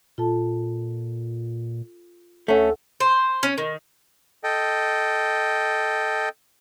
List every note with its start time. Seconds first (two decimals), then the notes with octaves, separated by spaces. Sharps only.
0.18 A#2 F4 A4 A5
2.48 D2 A3 C#4 A4 F#5
3.00 C5
3.43 C#4
3.58 D#3
4.44 A4 D#5 G5